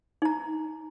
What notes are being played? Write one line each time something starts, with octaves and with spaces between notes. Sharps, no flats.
D#4 A#5